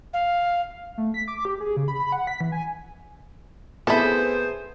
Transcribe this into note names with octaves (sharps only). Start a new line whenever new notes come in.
F5
A3
B6
D6
G4
G#4
C#3
B5
B5
F#5
B6
E3
G#5
B3 C4 E4 G#4 A4 C5